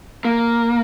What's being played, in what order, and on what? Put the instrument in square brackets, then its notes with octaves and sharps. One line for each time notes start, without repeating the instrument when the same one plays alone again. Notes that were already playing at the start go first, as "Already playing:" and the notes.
[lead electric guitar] A#3